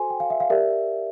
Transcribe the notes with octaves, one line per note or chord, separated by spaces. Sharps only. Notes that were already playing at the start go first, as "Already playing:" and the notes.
Already playing: F#4 A4 C5 G#5 C6
G5
F5
E5
F5
G4 A#4 D5 E5